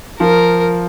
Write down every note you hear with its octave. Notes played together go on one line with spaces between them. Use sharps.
F3 A#4